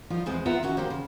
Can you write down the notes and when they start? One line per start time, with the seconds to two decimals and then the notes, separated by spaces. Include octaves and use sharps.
0.10 G2 F3 D#4 F4
0.26 E2 C3 G#3 B3 C5
0.46 B3 F4 B4 E5 F#5 A#5
0.63 D#3 C#4 F#4
0.77 D#3 A#3 G4 C5
0.90 C#3